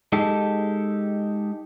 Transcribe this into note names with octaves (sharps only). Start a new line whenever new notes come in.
G#3 D#4 G4 A4